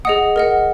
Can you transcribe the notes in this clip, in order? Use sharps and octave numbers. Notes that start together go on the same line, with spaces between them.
G#4 D#5 F#5 D#6
A#4 D#5 F#5